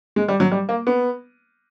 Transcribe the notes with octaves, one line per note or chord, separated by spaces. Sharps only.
G#3
G3
F#3
G3
A#3
B3